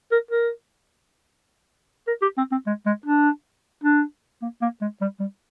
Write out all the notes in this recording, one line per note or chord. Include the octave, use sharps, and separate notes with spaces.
A#4
A#4
A#4
G4
C4
C4
G#3
G#3
D4
D4
A#3
A#3
G#3
G3
G3